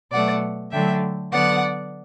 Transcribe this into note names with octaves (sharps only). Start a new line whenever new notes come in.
B2 F#3 A3 D5 F#5
D3 F#3 A3 E5 G5
D3 F#3 B3 D5 F#5